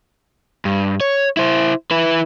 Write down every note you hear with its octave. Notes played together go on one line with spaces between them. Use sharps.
G2
C#5
E4 C5
E4 B4